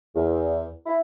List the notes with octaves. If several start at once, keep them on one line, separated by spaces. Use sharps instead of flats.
E2
E4